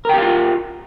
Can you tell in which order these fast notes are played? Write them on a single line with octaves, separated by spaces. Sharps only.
A#4 G5 G4 F5 F4